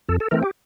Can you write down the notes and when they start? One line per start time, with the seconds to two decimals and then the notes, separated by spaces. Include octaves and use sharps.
0.09 F2 A4
0.20 A4
0.31 E3 A3 C4 A#4
0.43 G4